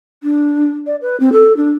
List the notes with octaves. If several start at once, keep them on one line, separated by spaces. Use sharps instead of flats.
D4
D5
B4
C4
A4
D4